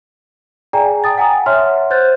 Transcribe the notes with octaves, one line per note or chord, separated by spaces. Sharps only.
G#4 D5 G5 G#5 A#5
G5 A5 D#6 A6
F#5 G#5 A#5 D#6
C#5 E5 F#5 C6 F6
C5 F#6 G6 A6